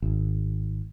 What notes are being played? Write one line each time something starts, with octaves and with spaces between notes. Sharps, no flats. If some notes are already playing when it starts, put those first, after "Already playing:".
G#1